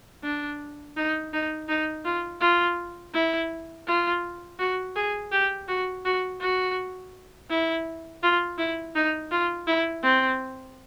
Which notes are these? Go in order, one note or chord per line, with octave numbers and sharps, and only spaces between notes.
D4
D#4
D#4
D#4
F4
F4
E4
F4
F#4
G#4
G4
F#4
F#4
F#4
E4
F4
E4
D#4
F4
E4
C4